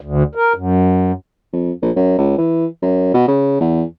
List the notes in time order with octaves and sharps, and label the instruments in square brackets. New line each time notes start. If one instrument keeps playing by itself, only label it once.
[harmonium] D2
A#4
F#2
[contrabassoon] F2
A#1
F#2
C#2
E3
F#2
B2
C#3
E2